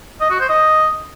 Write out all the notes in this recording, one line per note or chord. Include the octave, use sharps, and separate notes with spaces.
D#5
F#4
C5
D#5